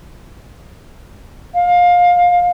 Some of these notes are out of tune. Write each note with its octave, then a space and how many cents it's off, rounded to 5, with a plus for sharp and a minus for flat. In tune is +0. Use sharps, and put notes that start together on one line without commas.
F5 +20